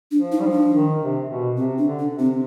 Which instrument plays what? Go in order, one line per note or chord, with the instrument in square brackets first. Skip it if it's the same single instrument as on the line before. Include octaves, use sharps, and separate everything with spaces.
[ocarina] D4
[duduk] F3
[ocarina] D#4
[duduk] G3
F3
[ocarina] D4
[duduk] D#3
C3
B2
[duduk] C3 [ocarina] C4
[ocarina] D4
[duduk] D3
[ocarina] D4
[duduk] C3
[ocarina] C4